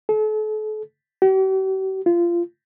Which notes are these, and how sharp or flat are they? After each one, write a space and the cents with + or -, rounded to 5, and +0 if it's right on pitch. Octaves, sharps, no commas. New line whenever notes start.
A4 -40
G4 -45
F4 -20